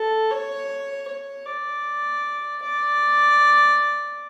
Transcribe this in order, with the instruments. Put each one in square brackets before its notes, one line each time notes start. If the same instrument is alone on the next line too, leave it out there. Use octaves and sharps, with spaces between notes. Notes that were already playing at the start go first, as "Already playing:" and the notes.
Already playing: [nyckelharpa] A4
C#5
C#5
D5
D5